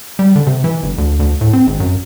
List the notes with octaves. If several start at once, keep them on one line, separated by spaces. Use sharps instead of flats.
G3
D3
C3
E3
G1
D2
D2
A2
C4
G#1
F#2